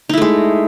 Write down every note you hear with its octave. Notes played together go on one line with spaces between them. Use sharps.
G#3 A3 D#4 E4